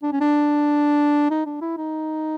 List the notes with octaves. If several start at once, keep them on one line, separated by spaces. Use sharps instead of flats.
D4
C#4
D4
D#4
D4
E4
D#4